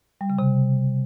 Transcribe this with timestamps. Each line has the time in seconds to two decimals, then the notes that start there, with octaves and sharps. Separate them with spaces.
0.21 G3
0.30 C#3
0.39 C3